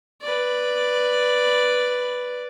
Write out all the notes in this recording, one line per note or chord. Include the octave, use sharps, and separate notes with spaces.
B4 D5